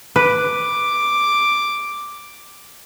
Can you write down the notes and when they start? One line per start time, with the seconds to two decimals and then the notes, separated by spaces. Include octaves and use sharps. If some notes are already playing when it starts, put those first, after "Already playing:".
0.16 B4 D6